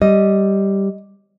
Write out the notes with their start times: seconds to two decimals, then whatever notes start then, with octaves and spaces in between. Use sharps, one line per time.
0.02 G3 D#5